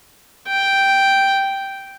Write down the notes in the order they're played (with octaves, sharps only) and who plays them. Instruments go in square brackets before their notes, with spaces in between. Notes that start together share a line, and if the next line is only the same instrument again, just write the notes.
[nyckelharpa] G5